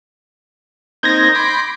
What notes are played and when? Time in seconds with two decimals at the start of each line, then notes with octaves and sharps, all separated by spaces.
1.03 A#3 C4 D#4 G6 G#6 A#6
1.35 B5 C6 D6